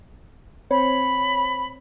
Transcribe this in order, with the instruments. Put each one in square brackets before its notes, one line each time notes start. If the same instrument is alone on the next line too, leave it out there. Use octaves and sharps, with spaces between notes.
[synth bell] C4 C5 C#5 [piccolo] B5